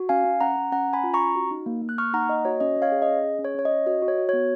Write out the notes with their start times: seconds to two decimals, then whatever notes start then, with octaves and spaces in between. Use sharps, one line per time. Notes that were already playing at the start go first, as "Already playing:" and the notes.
Already playing: F#4
0.09 C#4 F5 G#5
0.25 C#4
0.41 C#4 F#5 A#5
0.56 C#4
0.72 C#4 F#5 A#5
0.88 C#4
0.93 G#5 B5
1.04 F4
1.14 A#5 C#6
1.19 C#4
1.36 F#4
1.51 D#4
1.66 A#3
1.82 A#3
1.89 F#6
1.98 A#3 C#6 F6
2.14 D#4 F#5 A#5
2.29 A#3 D#5
2.45 F#4 C#5
2.60 C#4 D#5
2.76 C#4
2.82 C#5 F5
2.92 G#4
3.02 D#5
3.08 C#4
3.24 G#4
3.39 C#4
3.44 C#5
3.55 C#4 C#5
3.65 D#5
3.71 C#4
3.86 F#4 D#5
4.02 F#4
4.08 C#5
4.18 F#4
4.29 C#5
4.33 B3